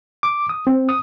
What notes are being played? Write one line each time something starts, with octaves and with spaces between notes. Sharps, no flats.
D6
D#6
C4
D#6